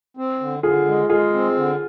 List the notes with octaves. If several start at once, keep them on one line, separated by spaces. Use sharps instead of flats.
C4
D3
D3 F4 G#4
G#3
G#3 F4 G#4
C4
D3